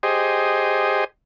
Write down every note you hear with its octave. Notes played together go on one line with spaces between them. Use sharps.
G4 G#4 C5 D#5